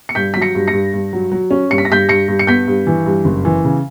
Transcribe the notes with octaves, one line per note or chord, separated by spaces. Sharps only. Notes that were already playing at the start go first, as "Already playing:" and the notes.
C#7
G2 G6 B6
F#3 B6
A#6 C#7
G2
A#6 C#7
G2
G2
F#3
F#3
C#4
G2 C#7
B6
A#6
G2 G6 B6
G2 A#6 C#7
G2
C#7
B3 G6 B6
G2
E3
G2
F#1
E3
C#3